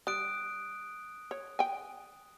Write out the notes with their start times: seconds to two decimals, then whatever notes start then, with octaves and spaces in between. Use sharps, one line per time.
0.07 G3 D#6 F#6 D7
1.31 C#5
1.59 G5 G#5